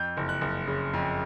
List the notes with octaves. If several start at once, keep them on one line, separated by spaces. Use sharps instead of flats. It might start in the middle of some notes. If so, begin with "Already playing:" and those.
Already playing: F2 G6
F#1
F#6
F#1
C#3
F2